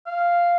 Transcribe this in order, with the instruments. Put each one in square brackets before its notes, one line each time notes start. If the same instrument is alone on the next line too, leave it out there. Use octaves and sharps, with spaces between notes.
[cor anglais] F5